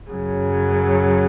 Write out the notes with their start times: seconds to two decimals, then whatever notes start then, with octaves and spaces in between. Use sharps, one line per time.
0.10 F#2 C#3 F#3